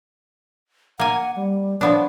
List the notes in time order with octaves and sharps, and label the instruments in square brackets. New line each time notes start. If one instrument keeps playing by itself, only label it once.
[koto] A#3 G#5 [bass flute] F#5
[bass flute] G3
[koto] F3 B3 D4 [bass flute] C#5